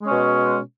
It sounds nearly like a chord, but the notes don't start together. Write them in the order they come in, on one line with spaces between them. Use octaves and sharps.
G#3 C#4 B2